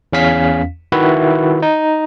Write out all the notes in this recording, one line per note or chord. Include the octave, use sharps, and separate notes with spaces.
E2 C#4 F5 B6
D#3 E4 F#4 B4 E5
D#4